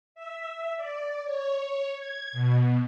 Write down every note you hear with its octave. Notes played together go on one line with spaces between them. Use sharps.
E5
D5
C#5
G#6
B2